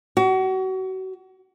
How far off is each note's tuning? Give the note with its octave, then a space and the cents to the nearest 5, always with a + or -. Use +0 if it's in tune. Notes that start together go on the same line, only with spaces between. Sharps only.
F#4 +30